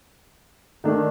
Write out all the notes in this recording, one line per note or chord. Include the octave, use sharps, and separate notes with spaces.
D#3 A3 D4